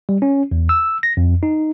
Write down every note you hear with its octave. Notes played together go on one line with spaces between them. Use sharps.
G3
C#4
E2
E6
A#6
F2
D#4